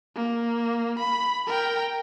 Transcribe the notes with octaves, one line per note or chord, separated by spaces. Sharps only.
A#3
B5
A#4 G5